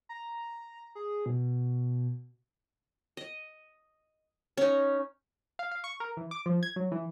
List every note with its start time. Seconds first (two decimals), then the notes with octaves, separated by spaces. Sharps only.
0.09 A#5
0.95 G#4
1.26 B2
3.17 D#5
4.57 C#4 D#4
5.59 F5
5.72 F5
5.84 C#6
6.00 A#4
6.17 E3
6.31 D6
6.46 F3
6.63 G#6
6.76 F#3
6.92 E3